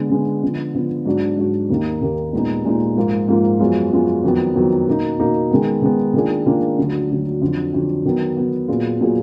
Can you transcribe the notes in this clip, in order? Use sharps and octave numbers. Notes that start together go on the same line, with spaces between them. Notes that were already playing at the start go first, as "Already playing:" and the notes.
Already playing: D3 G#3 B3
D3 G#3 B3
D3 F3 B3
D3 F3 B3
G#2 F#3 D4 F#4
G#2 F#3 D4 F#4
D#2 D#3 A#3 D#4
D#2 D#3 A#3 D#4
A#2 G#3 B3 D#4
A#2 G#3 B3 D#4
G#2 F3 A#3 F4
G#2 F3 A#3 F4
F#2 F3 G#3 B3 F4
F#2 F3 G#3 B3 F4
F2 D#3 F#3 B3
F2 D#3 F#3 B3
B2 A#3 D#4
B2 A#3 D#4
D#3 G#3 B3
D#3 G#3 B3
D#3 A#3 D4 F4 G#4
D#3 A#3 D4 F4 G#4
D2 D3 F#3
D2 D3 F#3
F2 D3 F#3
F2 D3 F#3
D#3 F#3 B3
D#3 F#3 B3
A#2 F#3 B3 F4 G#4
A#2 F#3 B3 F4 G#4